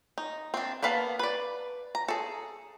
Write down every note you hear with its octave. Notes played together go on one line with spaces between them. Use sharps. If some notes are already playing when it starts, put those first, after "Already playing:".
D#4
C4 D4
A#3 B3 B4 F5 A5
B4 D5
A#5
G#4 A4